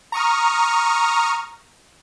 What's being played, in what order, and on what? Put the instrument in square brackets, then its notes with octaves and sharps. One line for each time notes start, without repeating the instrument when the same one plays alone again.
[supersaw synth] A#5 C#6 D#6 F6